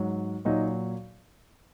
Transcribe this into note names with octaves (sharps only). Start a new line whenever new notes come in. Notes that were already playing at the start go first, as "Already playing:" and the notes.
Already playing: G#2 F#3
A#2 F#3 D#4